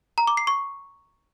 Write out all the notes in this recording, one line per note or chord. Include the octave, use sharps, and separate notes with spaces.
A#5
D6
C7
C#6